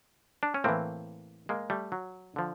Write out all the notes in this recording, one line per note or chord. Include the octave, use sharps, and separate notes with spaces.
D4
C#4
A2 E3 A#3 C4
G#3 A#3
G3 A3
F#3
D3 F3